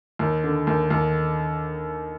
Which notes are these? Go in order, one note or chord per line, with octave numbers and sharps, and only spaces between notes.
D#2
D3
D#2
D#2